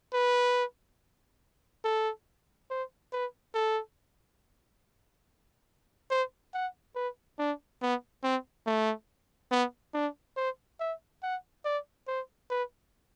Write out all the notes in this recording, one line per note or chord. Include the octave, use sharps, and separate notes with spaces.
B4
A4
C5
B4
A4
C5
F#5
B4
D4
B3
C4
A3
B3
D4
C5
E5
F#5
D5
C5
B4